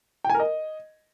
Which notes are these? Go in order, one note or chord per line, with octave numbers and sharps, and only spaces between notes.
G5
G#5
A#4
D#5